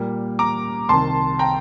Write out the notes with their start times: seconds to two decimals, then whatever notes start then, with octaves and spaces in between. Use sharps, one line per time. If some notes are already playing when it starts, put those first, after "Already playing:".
Already playing: A#2 G3 A#3
0.39 A#5 D6
0.89 C2 C3 D#3 A5 C6
1.39 G5 A#5